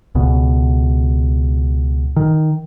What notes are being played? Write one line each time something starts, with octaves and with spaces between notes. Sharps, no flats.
C#2 B2
D#3